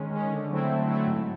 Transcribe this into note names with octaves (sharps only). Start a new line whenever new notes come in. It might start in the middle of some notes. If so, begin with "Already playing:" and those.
Already playing: D#3 G#3 C#4
G#3 C#4
D3
F#3 A3 C4 E4
D3
F#3 A3 C4 E4
G#2